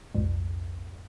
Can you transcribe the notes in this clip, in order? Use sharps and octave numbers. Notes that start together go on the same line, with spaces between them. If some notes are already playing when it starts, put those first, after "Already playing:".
B1 F2 G#2